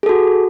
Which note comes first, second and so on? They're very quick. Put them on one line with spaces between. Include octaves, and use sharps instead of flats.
G#4 A4 F#4